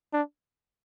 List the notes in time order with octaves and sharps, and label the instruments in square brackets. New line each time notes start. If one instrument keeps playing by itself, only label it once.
[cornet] D4